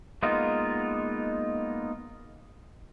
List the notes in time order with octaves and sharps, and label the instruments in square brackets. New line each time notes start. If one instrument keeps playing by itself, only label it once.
[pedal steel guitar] G#3 A#3 B3 D#4 F4